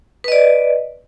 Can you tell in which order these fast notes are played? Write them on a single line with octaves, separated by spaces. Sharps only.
B4 D#5 D5